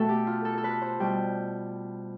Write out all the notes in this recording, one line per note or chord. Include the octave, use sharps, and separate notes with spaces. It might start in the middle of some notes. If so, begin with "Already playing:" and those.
Already playing: B2 A3 A4 G5
G4
F4
A4
A4
B4
C5
B2 G3 G5